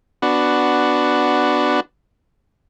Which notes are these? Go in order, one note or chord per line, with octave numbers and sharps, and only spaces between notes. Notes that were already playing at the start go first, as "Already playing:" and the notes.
B3 D4 F#4